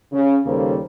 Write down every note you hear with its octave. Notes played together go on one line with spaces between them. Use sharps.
C#3
D#2 C#3 G3 A#3 A4 C5